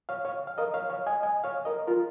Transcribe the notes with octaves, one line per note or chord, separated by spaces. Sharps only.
C#5 F5
C#5 F5
F5
A#4 D#5
C#5 F5
C#5 F5
D#5 G#5
D#5 G#5
C#5 F5
A#4 D#5
F4 A#4